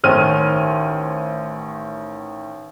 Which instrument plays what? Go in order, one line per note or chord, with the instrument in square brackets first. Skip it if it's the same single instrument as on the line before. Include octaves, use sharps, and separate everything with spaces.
[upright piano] A1 D#3 C5 C#5 F6 D#7